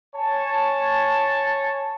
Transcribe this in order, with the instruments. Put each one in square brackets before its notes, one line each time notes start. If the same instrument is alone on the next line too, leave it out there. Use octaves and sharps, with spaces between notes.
[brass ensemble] C#5 G#5 A5